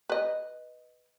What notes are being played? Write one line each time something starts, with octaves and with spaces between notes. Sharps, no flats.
B4 D#5